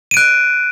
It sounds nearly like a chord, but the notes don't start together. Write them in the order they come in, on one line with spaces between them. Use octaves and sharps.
D#7 D7 F#6